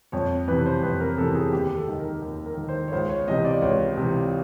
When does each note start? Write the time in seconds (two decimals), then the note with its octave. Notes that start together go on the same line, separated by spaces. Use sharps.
0.12 F2 C#5
0.48 C3 E3 B4
0.66 C5
0.83 F2 B4
1.00 A#4
1.17 C3 E3 A4
1.35 G#4
1.53 D#2 G4
1.76 A4
1.88 D#3
1.99 A#4
2.22 D#2
2.46 A#4
2.57 D#3
2.69 C5
2.88 C#5
2.92 C#2 C5
3.09 C#5
3.28 C3 E3 D#5
3.45 D5
3.62 C#2 C#5
3.97 C3 E3